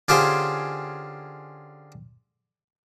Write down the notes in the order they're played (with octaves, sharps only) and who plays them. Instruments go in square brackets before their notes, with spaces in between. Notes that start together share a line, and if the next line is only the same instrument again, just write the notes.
[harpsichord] D3 C#4 F4 G4 G#4 C5